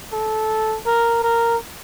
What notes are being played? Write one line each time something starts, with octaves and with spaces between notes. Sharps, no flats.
A4
A#4
A#4